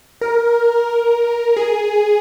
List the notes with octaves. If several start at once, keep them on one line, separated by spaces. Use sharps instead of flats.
A#4
G#4